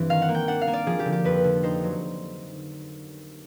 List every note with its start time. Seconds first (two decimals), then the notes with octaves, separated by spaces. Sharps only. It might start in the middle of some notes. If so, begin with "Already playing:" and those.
Already playing: G2 E3 G3 C4
0.09 D#3 F5
0.22 F#5
0.28 A#3
0.35 G5
0.48 D4 F#5
0.61 F5
0.67 A#3
0.73 D5
0.86 F3 G#4
0.99 G4
1.05 D3
1.12 G4
1.24 F2 B4
1.44 D3
1.63 D#4 C5
1.83 F#3